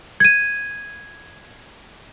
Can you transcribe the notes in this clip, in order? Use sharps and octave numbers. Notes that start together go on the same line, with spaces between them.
G#6 D#7